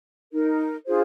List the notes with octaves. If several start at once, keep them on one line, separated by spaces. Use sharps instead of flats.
D#4 A#4
D4 F4 G#4 C5